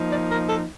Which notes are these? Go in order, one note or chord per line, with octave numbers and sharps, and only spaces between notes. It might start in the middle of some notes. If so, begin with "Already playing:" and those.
Already playing: F3 A#3 D#4
D5
A#4
A4